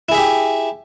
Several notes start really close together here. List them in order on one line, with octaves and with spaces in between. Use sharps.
E4 G#4 E5 G4